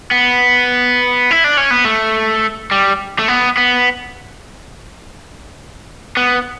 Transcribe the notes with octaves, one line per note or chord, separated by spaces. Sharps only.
B3
E4
D4
C#4
B3
A3
G3
A3
B3
B3
B3